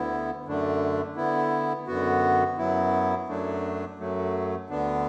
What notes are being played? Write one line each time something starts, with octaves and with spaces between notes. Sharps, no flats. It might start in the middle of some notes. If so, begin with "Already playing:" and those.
Already playing: D2 D3 B3 E4
F#2 D3 A3 D4
D3 B3 E4
F#2 D3 B3 F#4
F#2 F#3 B3 E4
F#2 F#3 A3 D4
F#2 F#3 A3
D2 D3 B3 D4